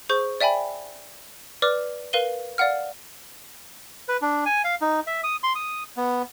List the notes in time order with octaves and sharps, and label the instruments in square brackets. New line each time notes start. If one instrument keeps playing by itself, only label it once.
[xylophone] G#4 C5 C#6 G6
D5 E5 G5 G#5 B5
B4 D5 D6 F6
A#4 B4 F5 D#7 G7
D5 F5 F#5 F6
[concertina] B4
D4
G#5
F5
D#4
E5
D#6
C6
D#6
B3